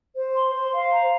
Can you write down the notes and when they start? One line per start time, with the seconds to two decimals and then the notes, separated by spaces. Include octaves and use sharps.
0.15 C5
0.34 C6
0.54 C5
0.74 F5
0.92 A#5